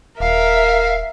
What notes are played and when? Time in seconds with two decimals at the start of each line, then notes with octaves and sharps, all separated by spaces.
0.20 D#1 A#4 E5 F5